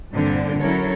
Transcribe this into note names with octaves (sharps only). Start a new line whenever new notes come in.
G2 A#2 D3 C4
F#3 C#4 E4 A4 A#4 C#5